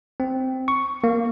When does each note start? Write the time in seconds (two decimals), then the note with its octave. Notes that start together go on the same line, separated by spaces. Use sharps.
0.20 C4
0.68 C#6
1.04 A#3